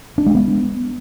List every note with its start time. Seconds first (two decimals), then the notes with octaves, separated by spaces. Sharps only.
0.18 D4
0.26 G#3
0.35 B3